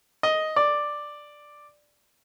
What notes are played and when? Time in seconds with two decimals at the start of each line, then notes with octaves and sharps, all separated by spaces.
0.23 D#5
0.56 D5